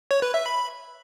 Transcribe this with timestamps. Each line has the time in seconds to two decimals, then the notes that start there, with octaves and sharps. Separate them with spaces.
0.11 C#5
0.22 B4
0.34 E5
0.46 B5